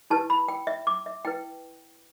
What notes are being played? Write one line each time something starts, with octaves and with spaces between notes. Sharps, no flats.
E4 G4 B4 A5
B5
G5
E5
D6
E5
E4 B4 G5